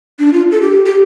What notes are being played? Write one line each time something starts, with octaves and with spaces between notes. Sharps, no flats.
D4
F4
A4
G4
G4